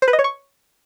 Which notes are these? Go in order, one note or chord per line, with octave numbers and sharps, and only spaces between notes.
C5
B4
D#5
C#5
C#6